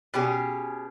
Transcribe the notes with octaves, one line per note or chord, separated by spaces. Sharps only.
B2 C#4 G4 G#4